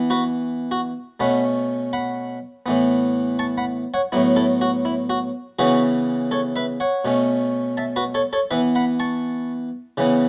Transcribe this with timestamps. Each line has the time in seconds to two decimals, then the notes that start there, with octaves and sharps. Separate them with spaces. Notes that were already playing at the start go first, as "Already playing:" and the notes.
Already playing: E3 B3
0.10 F#4 B4
0.71 F#4
1.20 B2 A3 C#4 F#5 B5
1.93 F#5 B5
2.66 A2 E3 B3
3.39 A5 C#6
3.58 F#5 B5
3.94 C#5 F#5
4.12 A2 F#3 B3 E4
4.36 E4 A4
4.61 F#4
4.85 E4
5.10 F#4
5.59 C#3 E3 B3 F#4 B4
6.31 A4 C#5
6.56 B4 E5
6.80 C#5 F#5
7.05 B2 A3 C#4
7.77 E5 A5
7.96 F#4 B4
8.15 A4 C#5
8.33 A4 C#5
8.51 E3 B3 B4 E5
8.75 F#5 B5
9.00 A5 C#6
9.97 C#3 E3 B3